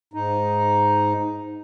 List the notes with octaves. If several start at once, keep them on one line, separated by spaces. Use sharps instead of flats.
G#2 D#4